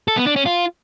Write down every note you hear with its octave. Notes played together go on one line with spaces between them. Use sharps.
A4
B3
D4
C#4
F4